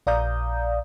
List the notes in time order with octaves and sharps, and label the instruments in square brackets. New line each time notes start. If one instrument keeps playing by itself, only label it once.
[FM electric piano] A#1 D5 F5 A#5 D#6 G6